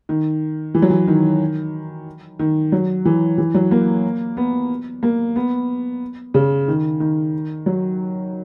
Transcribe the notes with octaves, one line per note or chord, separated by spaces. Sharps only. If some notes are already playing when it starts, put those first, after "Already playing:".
D#3
E3
F#3
E3
D#3
D#3
F#3
E3
E3
F#3
A#3
B3
A#3
B3
C#3
D#3
D#3
F#3